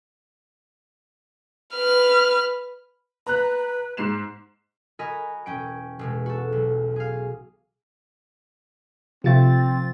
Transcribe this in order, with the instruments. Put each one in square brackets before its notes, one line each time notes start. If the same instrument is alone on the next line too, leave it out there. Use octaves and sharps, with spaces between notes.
[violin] B4 F6
[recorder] B4 [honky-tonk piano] A#5 F#6
[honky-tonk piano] G#2 C7 E7
[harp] F#4 A#4 D#5 G#5 B5
E1 C#4 G5 D7
E1 B2 G#3
F#4 A4
B1
G#4 F5
[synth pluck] C3 A3 [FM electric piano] F3 F4 A6 [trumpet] C4